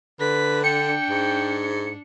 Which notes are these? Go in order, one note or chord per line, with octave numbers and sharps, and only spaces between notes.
D3 B4 B6
D4 G5 C#7
G#2